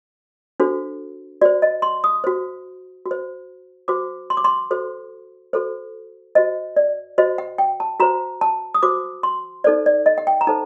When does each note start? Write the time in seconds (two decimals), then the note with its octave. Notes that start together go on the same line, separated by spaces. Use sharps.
0.60 D4 F#4 A4 C5
1.41 F#4 C5 D5
1.62 D#5
1.82 C6
2.04 D#6
2.24 F#4 C5
3.06 F#4
3.11 C5
3.88 F#4 C5 D6
4.30 C6
4.37 D6
4.44 C6
4.71 F#4 A4 C5
5.53 F#4 A4 C5
6.35 F#4 C5 D#5
6.76 D5
7.18 F#4 C5 D#5
7.38 F#5
7.58 G5
7.80 A5
8.00 F#4 C5 A#5
8.41 A5
8.74 D#6
8.83 F#4 C5 D6
9.23 C6
9.64 D#4 A4 C5 D5
9.86 D5
10.06 D#5
10.18 F#5
10.27 G5
10.41 A#5
10.47 D#4 A4 C5 A5